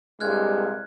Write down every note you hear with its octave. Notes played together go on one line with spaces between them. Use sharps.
C2 G2 A#2 G#3 F6 F#6 G#6